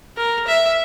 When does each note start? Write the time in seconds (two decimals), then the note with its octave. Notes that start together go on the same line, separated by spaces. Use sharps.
0.17 A#4
0.47 E5